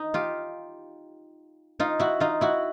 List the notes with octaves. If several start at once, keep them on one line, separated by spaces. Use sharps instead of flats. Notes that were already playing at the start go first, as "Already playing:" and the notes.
Already playing: D#4
F4 G4
D#4 F4
E4 F#4
D#4 F4
E4 F#4